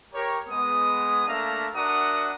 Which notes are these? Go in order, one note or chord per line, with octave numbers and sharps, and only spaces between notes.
G4 A#4 C#5
G#3 B3 D#6
A3 A#3 D4 E5 F5 A#5
D4 F#4 A#4 E5 F#5 D#6